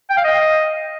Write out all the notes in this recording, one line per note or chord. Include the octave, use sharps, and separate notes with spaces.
G5
F5
D#5